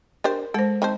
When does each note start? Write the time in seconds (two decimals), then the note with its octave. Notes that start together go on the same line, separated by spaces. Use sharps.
0.24 D4 G4 A#4 C5
0.54 G#3 A4 C5
0.82 D#3 C4 C5 A5